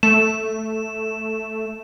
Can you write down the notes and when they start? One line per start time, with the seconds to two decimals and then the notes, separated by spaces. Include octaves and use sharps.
0.03 A3 E7